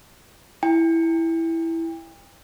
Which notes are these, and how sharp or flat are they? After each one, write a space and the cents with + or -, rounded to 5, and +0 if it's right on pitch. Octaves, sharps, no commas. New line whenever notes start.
E4 +0 G5 +35